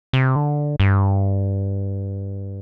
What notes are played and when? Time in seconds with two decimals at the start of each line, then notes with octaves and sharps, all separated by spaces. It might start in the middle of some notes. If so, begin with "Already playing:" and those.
0.13 C3
0.36 D3
0.80 G2